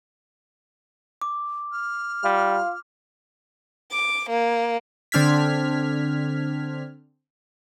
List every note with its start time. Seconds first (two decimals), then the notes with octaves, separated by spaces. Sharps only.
1.22 D6
1.72 F6
2.24 G3 F4
3.92 D6
4.29 A#3
5.12 D3 C4 D4 F6 G#6 B6